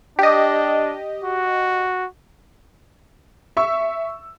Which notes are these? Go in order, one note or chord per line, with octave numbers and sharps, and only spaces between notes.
D4 G4 D#5
F#4
E5 C#6 E6